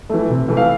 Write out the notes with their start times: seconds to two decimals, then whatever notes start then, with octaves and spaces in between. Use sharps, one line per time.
0.10 E3 A3
0.30 C3
0.48 E3 A3
0.57 F5